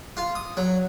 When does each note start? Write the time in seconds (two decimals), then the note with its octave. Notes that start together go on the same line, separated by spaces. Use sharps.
0.17 F4
0.35 D#6
0.57 F#3